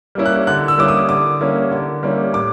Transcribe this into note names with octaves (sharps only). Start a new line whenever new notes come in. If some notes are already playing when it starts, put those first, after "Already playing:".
G3 A#3 C#4 E4
F#6
D3 F#6
E6
G3 A#3 C#4 E4 D6
D#6
D3 D6
G3 A#3 C#4 E4
D3
G3 A#3 C#4 E4
A2 D6